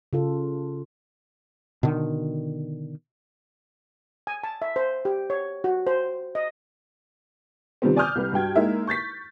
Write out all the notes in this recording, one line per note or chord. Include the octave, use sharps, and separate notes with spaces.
C#3 F4 A4
B2 D3 D#3
G#5
A5
E5
C5
G4
C#5
F#4
C5
D#5
C3 D#3 F3 G3 B3 C4
D5 G#5 D6 D#6 F6 G6
C2 G4 B4
G2 F#4 G5 G#6
G#3 A#3 D#4 E4 A#4 E5
C#6 G6 A6 B6